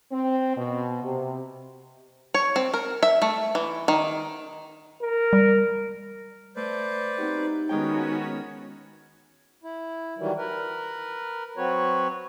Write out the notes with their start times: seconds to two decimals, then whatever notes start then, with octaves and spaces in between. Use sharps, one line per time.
0.11 C4
0.56 B2
1.02 C3
2.34 C#5
2.56 C4
2.74 A#4
3.03 E5
3.22 A3
3.55 E3
3.88 D#3
5.02 A#4
5.33 G3
6.56 A3 B4 C5 D5
7.18 C4 D#4 F#4 G4
7.69 D#3 G#3 B3 C#4 F#4 C#5 G5
9.63 E4
10.18 D#3 E3 F#3 G3
10.38 A#4 B4
11.57 F#3 C4 F#4 B4 C#5